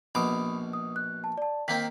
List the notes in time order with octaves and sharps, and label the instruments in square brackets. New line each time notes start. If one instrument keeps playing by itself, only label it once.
[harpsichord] A#1 B2 D6 [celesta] B5 D#6
[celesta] D#6
F#6
A5
D5 A5
[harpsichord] D#3 A#3 C4 [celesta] B6